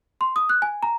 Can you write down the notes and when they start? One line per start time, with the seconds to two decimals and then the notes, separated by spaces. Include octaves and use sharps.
0.21 C6
0.36 D#6
0.49 F#6
0.62 G#5
0.83 A#5